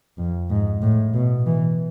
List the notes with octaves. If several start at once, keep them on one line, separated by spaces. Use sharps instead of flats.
F2
G#2
A2
B2
E3